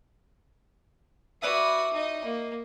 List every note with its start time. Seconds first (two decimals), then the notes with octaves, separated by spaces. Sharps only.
1.42 E4 F#4 B4 D5 D#6
1.93 D#4 D#5
2.25 A#3